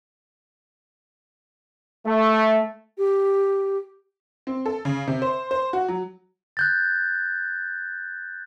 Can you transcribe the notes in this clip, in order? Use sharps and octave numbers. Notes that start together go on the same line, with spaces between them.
A3
G4
C4
A4
C#3
C3
C5
C5
F#4
F#3
F#6 G6 A6